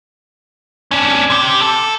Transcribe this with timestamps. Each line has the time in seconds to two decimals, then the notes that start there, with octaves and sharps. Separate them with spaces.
0.91 C#4 D4
1.30 C3 G4
1.61 A4